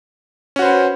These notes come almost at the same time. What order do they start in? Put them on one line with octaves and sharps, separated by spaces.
C#4 F#4 C5 B4